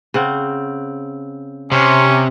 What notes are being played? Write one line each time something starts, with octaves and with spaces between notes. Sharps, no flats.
C#3 C4 F#5
C3 C#4